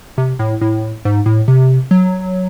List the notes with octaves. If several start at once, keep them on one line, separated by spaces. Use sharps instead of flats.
C3
A2
A2
G#2
A2
C3
F#3